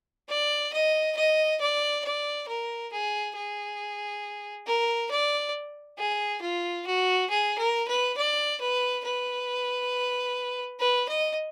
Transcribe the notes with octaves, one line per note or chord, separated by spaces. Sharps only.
D5
D#5
D#5
D5
D5
A#4
G#4
G#4
A#4
D5
G#4
F4
F#4
G#4
A#4
B4
D5
B4
B4
B4
D#5